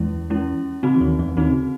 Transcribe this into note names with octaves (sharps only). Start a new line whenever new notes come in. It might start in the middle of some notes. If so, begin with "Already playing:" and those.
Already playing: E2 E3 G#3 C#4 E4
G#3 C#4 E4
C#3 C4 D#4 F#4
E3
D#2 D#3
E2 E3
D#2 D#3 C4 D#4 F#4
C#3